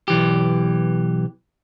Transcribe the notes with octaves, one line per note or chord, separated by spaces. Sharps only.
B1 E3 G4